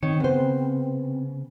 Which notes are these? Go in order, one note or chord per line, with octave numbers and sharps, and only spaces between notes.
D#3 C4 C#5
C#3 B3 C5